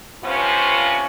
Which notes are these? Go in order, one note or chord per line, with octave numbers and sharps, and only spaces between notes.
G2 C3 B3 C#4 F4 C5